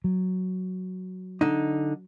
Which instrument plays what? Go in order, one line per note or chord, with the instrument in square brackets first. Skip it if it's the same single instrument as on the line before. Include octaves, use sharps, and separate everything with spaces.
[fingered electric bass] F#3
[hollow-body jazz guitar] D3 D#4